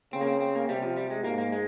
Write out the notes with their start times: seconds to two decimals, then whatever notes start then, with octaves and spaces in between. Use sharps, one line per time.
0.13 C#3 C4
0.21 A#3
0.27 C4
0.40 C4
0.55 A#3
0.68 C3 G3
0.83 F3
0.96 G3
1.10 G#3
1.24 G#2 A#3
1.38 A#3
1.52 G#3